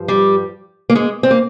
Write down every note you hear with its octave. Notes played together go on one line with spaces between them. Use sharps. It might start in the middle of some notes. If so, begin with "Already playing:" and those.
Already playing: G2 F3
G3
A#3
G#3
C4
A#3